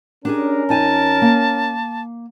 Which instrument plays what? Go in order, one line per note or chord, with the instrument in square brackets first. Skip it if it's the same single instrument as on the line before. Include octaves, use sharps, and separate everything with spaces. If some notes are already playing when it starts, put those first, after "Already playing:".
[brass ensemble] C#4 A#4 [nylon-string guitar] D4 G4 G#4
[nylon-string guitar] F2 D#4 G#5 [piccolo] A5
[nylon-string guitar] A#3